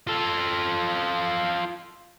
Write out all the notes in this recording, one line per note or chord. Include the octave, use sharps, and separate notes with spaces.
F4 A4